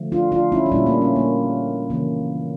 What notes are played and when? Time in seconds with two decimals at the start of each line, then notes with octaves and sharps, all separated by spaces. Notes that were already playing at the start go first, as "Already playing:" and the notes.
Already playing: D3 F3 A3
0.12 D4 F4
0.32 D4 F4
0.52 C#4 E4
0.66 D4
0.72 A#2 G3 A#3 C#4 E4
0.86 A#3 D4
1.02 C#4
1.16 A#3
1.90 C#3 E3 A#3